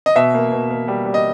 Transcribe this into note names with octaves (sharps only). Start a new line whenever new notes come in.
D#5
B2 E5
A#3
B2
A#3
G3
G3
D#5